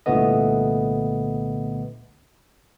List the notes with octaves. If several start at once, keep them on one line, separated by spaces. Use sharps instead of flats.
C2 A#2 D3 A3 B3 D#5